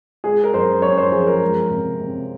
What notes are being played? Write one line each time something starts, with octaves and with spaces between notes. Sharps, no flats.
G#3 G#4
A#4
F#2 C5
F#2 C#5
C5
F3 G#4
A#4
G#3
C3
C3